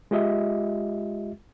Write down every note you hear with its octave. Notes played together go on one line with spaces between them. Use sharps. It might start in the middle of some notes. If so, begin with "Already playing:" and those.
G#3 F4 G4 D#5 E5